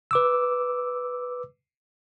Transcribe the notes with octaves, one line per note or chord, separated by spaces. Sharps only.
B4 D6 E6